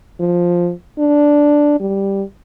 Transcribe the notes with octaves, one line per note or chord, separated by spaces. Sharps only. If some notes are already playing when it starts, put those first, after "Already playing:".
F3
D4
G3